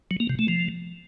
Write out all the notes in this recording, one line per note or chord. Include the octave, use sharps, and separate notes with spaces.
F#3
A#3
C3
A3
F3